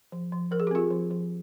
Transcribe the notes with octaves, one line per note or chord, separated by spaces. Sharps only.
F3
F3
F3 A#4
G#4
G4
C4 F4 G#4
F3
F3